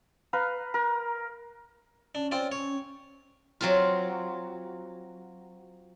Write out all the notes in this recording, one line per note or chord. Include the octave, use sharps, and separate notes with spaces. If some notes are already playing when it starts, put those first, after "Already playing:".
B4 F5 A#5
A#4
C#4 D4
C4 F4 D5
C#5
F#3 C4 F4